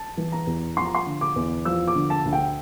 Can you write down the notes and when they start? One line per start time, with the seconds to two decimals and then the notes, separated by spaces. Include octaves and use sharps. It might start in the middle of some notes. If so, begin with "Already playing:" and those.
Already playing: A5
0.17 E3
0.32 A#5
0.47 E2
0.77 F3 C6
0.85 A#5
0.95 C6
1.06 D3
1.21 D6
1.36 E2
1.65 F3 E6
1.88 D6
1.95 D3
2.10 A5
2.25 D2
2.33 G5